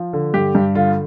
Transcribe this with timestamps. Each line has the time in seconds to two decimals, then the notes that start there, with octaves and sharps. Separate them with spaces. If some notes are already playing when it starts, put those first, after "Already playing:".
Already playing: F3
0.13 D3
0.34 G2 G4
0.55 G2
0.75 D3 F4